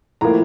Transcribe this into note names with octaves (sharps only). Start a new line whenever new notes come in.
A2 F3 A#3 A#5